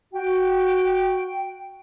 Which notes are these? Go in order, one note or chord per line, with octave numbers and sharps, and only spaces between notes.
F#4 G5